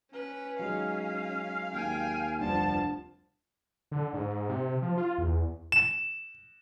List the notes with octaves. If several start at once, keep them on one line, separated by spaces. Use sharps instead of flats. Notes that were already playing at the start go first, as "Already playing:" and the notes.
C#4 B4
F#3 G#3 D#4 F5
D#2 G5 G#5
F1 D2 G2 F3 D4 A5
D3
G#2
C3
F3
F4
E2
E7